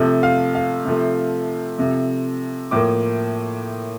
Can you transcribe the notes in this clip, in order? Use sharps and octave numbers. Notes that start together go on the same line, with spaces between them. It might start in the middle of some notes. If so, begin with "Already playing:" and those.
Already playing: C3 F3 A3
F5
F5
C3 F3 A3
C3 F3 A3
A2 F3 A#3 D6